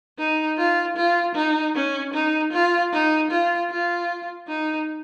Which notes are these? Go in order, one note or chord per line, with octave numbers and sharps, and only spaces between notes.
D#4
F4
F4
D#4
C#4
D#4
F4
D#4
F4
F4
D#4